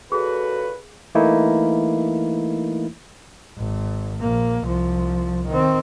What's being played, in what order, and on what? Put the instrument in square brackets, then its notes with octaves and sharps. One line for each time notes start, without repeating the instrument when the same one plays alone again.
[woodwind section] A#2 C#3 F#4 [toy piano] G#4 [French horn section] A4 [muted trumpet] B4
[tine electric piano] E3 A3 A#3 D#4 E4
[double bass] G#1
A#1 A#3
C2 F3
D#3 C4